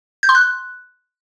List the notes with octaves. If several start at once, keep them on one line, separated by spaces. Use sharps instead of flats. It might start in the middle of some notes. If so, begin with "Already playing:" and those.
G6
C6
F#6